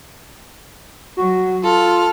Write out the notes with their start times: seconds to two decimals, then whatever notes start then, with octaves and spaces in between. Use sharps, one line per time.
1.17 F#3 F#4
1.63 F4 A4 F6